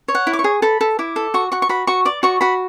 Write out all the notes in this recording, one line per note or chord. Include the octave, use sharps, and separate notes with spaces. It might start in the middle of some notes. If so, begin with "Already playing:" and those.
C#5
F#5
E4
D6
C#6
G#4
A4 B5
A4
E4 D6
A4
F#4 C#6
F#4 C#6
C#6
F#4 B5
F#4 C#6
D5 D6
F#4 C#6
F#4 B5